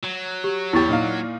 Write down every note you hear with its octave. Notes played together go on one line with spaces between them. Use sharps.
F#3
G4
E2 E4 G4 C#6 A6
A#2 D#4 F5